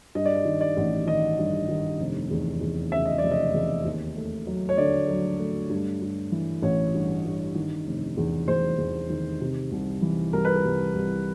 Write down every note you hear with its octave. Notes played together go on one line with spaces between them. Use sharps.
G2 D#5
D5
D#5
D#3
D5
A1
D#3 D#5
G2
D#3
F1
E2
E2
C#3 E5
D#5
F1 D5
D#5
E2
D#2
A3
F#3
C#5
D3 D5
F#3
A3
G2
G2
E3
A1 C#5
G2
G2
D#3
F1
E2
E2 C5
E2
D#3
C3
C2
E3
C2 A#4
B4
A#4
C2
C2